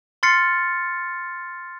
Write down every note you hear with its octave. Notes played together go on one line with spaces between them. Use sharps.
C6 F6 A6 C7 C#7